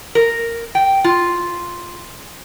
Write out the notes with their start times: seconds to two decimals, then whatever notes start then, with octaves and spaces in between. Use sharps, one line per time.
0.15 A#4
0.75 G5
1.04 F4